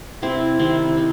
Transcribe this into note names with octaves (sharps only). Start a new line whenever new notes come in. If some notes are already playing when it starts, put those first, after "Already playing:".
C3 C4 E4
D#3 G3 C4 E4
C3 D#4